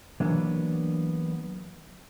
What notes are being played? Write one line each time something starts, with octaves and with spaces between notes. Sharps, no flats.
E3 F#3 A#3 B3 D4